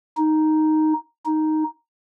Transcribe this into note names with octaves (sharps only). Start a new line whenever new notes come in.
D#4
D#4